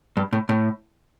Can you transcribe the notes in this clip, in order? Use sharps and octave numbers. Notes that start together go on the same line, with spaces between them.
G2
A2
A2